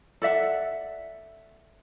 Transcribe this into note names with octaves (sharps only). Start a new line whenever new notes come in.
A4 D5 E5 F#5